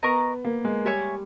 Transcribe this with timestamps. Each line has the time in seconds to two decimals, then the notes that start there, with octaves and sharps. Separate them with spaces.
0.03 B3 A#4 D#5 A#5 C#6
0.45 A#3
0.65 G#3
0.85 G3 C#5 E5 G#5 C#6